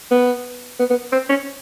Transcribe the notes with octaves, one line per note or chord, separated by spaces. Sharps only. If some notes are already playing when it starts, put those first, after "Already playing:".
B3
B3
B3
C4
C#4